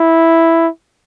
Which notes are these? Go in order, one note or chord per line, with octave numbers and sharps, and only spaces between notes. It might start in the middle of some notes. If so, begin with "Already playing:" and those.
Already playing: E4